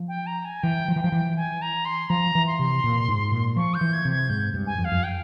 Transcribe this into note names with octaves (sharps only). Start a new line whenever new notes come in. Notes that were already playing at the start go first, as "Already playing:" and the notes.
Already playing: F3
G5
A#5
G#5
E3 G5
F3
E3
F3 G5
E3
G#5
A#5
C6
F3 A#5
E3
C6
C3
A#2
G#2
A#2
F3 C#6
G6
E3
G#6
C3
G#6
G#2 G6
G2
G#5
F2
F5
F2
G5